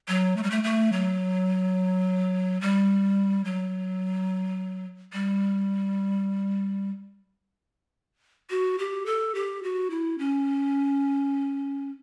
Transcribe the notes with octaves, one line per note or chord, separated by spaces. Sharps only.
F#3
A3
G3
A3
A3
F#3
G3
F#3
G3
F#4
G4
A4
G4
F#4
E4
C#4